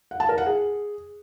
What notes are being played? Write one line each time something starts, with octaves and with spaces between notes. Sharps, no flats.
F#5
A5
A#4
F#5
G#4